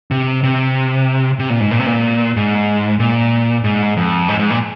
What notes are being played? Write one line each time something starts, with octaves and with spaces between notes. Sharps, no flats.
C3
C3
C3
A#2
G#2
A#2
C3
A#2
G#2
A#2
G#2
F2
G#2
G#2
A#2